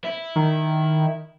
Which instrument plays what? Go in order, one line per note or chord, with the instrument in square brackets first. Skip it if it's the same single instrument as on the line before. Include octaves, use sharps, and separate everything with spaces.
[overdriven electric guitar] E4
[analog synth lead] D#3